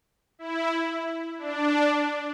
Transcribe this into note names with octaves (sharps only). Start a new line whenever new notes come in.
E4
D4